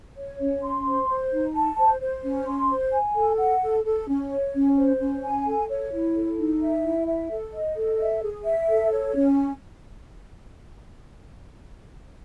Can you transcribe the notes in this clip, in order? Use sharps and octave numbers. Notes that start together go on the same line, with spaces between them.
C#5
C#4
C6
C5
C5
D#4
A5
C5
C5
C#4
C6
C5
G#5
A4
F#5
A4
A4
C#4
C#5
C#4
C5
C#4
G#5
A4
C#5
E4
A4
D#4
E5
E4
E5
A4
D#5
A4
E5
G#4
E5
A4
C#5
C#4